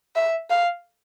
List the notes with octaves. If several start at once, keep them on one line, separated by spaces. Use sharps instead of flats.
E5
F5